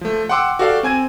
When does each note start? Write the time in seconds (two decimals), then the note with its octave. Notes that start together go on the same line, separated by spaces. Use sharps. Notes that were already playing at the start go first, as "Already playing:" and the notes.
0.01 F3 A3
0.29 F#5 G5 C6 D6 E6
0.59 F#4 G4 A4 D5 F5
0.83 C4 G#5 G#6 D#7